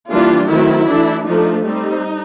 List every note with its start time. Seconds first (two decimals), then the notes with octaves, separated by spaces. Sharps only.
0.10 E3 G3 A#3 D4 F4
0.48 D#3 F#3 A3 C4 E4
0.86 E3 A3 D4
1.25 F3 A3 D4 D#4
1.64 G3 C4 D#4